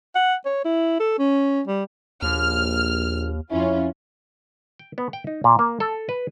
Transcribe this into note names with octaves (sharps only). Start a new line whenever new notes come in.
F#5
C#5
E4
A4
C#4
G3
A#1 D#2 F6
F2 C#4 E4 F4
G5
B3
G5
D#4
A#2
A#3
A4
B4